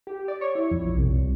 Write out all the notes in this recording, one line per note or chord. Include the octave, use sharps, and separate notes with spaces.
G4
D5
C#5
E4
F2
B1
C2